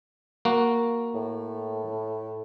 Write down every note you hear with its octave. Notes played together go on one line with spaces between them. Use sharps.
A#3 F#4
A2